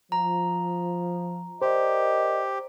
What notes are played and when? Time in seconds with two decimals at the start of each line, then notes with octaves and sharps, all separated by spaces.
0.12 F3 A#5
1.62 G4 A#4 C5 D5 D#5